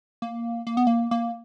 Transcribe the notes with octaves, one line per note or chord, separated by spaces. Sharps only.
A#3
A#3
B3
A#3
A#3